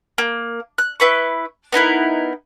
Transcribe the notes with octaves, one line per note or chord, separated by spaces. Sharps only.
A#3
F#6
E4 B4 C#6
B3 D#4 E4 A#4